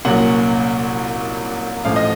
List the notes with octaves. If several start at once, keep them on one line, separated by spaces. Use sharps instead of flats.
C2 A#2 F#3 A#3 C#4 F#5
A1 A2 F3 C4 F5
D#5